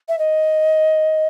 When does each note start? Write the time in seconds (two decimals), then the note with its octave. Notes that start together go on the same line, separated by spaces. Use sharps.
0.08 E5
0.19 D#5